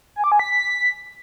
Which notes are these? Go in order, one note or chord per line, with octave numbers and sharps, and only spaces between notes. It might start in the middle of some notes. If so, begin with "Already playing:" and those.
G#5
D6
G#5
B6